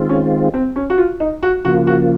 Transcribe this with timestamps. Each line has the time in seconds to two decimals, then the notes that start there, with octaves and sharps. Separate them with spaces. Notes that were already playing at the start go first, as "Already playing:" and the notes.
Already playing: D#3 G#3 C4 F4
0.09 C#4
0.54 C4
0.76 C#4
0.90 F#4
0.98 F4
1.20 D#4
1.43 F#4
1.65 C#3 F3 A#3 F4 F#4
1.87 F#4